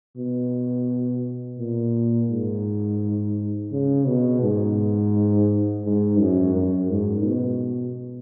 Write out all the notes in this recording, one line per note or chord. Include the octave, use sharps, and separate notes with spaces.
B2
A#2
G#2
C#3
B2
G#2
G#2
F#2
F#2
G#2
B2